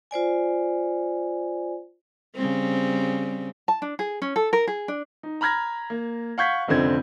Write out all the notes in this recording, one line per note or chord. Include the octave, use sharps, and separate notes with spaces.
F4 C5 D5 G#5
C#3 G3 C4
A5
D4
G#4
C#4
A4
A#4
G#4
D4
D#4
A#5 B5 F6 G#6 A#6
A#3
F5 F#5 C#6 G6 G#6 B6
F1 C#2 D3 C4 G#6